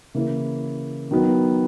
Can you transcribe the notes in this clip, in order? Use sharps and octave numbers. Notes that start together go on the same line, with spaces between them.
C#3 E3 A#3 E4
D#3 F#3 B3 D#4